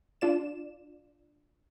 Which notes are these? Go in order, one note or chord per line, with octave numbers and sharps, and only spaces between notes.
D4 F4 D5 E7